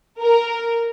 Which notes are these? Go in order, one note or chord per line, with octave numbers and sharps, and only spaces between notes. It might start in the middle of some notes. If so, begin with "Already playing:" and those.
A#4